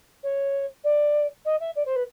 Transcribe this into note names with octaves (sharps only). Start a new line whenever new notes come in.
C#5
D5
D#5
E5
D5
C5
B4